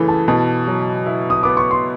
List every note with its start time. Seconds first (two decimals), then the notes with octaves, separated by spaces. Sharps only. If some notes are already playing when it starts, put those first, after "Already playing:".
Already playing: F#2 C#3 E3 A3
0.08 A5
0.28 B2 A5
0.67 F#3
1.06 E4
1.30 D#6
1.43 B3 D6
1.57 C#6
1.71 C6